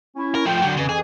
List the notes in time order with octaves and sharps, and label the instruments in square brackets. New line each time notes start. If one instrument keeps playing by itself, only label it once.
[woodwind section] C#4 E4
[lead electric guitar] A#4
[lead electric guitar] F3 A3 [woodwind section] G5
[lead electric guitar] D3 F#3
[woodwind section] F2 E3 [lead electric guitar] C#3
[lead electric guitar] G#4